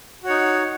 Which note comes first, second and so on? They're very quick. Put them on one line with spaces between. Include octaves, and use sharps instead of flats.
F#4 C#5 D#4